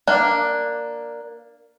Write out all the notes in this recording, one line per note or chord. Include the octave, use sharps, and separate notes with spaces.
A#3 D4